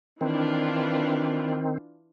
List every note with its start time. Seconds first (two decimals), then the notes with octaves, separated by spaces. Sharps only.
0.21 D#3 E3 C4 D4 F4